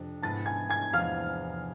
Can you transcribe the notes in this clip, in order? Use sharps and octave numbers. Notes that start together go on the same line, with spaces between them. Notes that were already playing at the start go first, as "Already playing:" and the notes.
Already playing: F2 C3 D4
G#2 G#3 B3 E4 A5 A6
G#5 G#6
G#5 G#6
E2 C3 F3 F5 F6